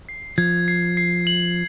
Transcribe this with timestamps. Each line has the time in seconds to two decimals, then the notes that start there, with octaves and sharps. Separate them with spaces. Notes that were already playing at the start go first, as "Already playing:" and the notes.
0.09 C7
0.38 F3 G#6
0.68 C7
0.97 C7
1.27 F#7